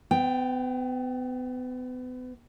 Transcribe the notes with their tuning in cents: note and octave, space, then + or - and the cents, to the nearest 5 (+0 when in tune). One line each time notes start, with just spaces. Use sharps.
B3 +35 G5 +0